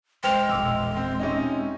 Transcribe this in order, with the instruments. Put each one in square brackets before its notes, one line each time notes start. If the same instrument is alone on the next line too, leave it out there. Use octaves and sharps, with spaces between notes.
[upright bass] E1 [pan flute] G#3 [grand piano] C5 [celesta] G5 F6 F7
[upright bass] E1 A#1 [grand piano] D6 E6
[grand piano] C4
C3 C#4 D#4